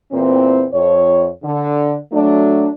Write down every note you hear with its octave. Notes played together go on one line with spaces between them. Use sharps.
E2 A#2 E3 C4
F2 C#5
D3
F#3 A3 D4